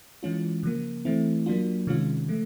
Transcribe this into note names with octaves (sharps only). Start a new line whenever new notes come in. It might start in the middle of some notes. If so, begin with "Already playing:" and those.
E3 G#3 C#4 F4
C#3 F3 A#3
E3 A3 C4 E4
F#3 A#3 D4 F4
C3 D#3 G#3 C#4 F4
C#3 F3 A3